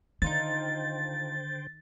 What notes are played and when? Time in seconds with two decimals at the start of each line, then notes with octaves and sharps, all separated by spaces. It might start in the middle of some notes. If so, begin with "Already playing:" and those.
0.22 D3 D#3 D#4 F4 A4 C5 G5 A6